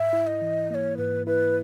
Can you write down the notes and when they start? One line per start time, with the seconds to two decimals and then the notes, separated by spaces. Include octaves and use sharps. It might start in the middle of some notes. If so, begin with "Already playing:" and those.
Already playing: G#2 E5
0.13 E4
0.27 D#5
0.42 E3
0.70 A#3 C#5 D#5
0.98 G#2 B4
1.27 E4 B4